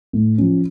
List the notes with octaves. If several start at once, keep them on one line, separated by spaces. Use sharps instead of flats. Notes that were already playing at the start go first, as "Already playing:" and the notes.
A2
F3 C#4